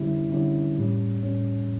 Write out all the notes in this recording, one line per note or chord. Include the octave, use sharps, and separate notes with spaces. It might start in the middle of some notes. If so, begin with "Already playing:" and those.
Already playing: D3 G3 C#4 E4
D3 G3 C#4 E4
A2 G3 C#4
A2 G3 C#4